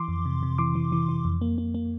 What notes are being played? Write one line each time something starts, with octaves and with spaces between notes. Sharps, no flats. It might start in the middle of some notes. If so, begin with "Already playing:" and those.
Already playing: E3 C6 D6
F2
C3
C3
E3 C6 D6
E3
E3
E3
F2
A#3
A#3
A#3